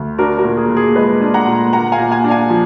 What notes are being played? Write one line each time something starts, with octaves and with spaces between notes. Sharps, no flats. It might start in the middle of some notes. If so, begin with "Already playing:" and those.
Already playing: D2
D4 F#4 A#4
F#4 A#4
A#2
G#4
A#2
G#4
G#3 B4 D#5
D4
F#5 A#5
A#2
A#3 F#5 A#5
F5 G#5
A#2
F5 G#5
D4
F5 G#5
F3